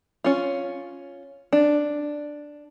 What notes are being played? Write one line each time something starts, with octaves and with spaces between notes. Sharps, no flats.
C#4 F4
D4